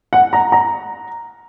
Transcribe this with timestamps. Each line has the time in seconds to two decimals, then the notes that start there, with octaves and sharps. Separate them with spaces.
0.13 F#5
0.33 A#5
0.52 A#5